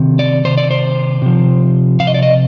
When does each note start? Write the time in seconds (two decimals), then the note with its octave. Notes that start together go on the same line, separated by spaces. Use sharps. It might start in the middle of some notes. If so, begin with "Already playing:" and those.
Already playing: C3 D#3
0.19 D5
0.44 C3 D#3 C5
0.57 D5
0.71 C5
1.22 C3 F3
2.00 C3 F3 F5
2.07 D#5
2.14 D5
2.23 D#5